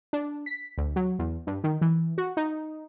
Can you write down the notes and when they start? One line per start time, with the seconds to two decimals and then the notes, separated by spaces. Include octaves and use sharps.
0.13 D4
0.46 B6
0.77 D2
0.96 F#3
1.19 E2
1.47 G2
1.64 D#3
1.81 E3
2.18 F#4
2.37 D#4